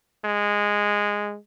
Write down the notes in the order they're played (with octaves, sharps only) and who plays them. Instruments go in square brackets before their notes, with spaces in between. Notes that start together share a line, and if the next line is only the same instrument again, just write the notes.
[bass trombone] G#3